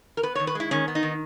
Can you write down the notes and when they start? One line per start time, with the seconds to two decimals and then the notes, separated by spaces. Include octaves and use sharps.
0.17 A#4
0.23 B3 B4
0.35 C#5
0.39 D#3
0.47 B4
0.55 G#3 E4
0.71 D#3 C#4
0.88 B3
0.95 D#4
1.03 D#3